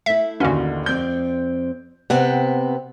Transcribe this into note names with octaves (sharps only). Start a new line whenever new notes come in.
A3 E4 E5
A1 D#2 D3 C#4 F#4
F2 C4 D5 G6
C3 B3 C4 F#5